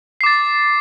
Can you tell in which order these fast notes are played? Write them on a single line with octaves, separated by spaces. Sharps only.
C7 D6 A6